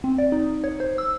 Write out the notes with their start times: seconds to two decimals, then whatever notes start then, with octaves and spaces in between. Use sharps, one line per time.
0.04 C4
0.18 D5
0.32 D#4
0.64 C#5
0.80 C5
0.98 E6